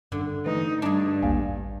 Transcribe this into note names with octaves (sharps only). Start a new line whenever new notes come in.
G2 D3
E3 A3 D#4
G2 D4 G#4
A1 D#2 F5 G#5